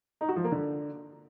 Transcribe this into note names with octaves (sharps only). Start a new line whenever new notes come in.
D#4
F#4
F3
A#3
D3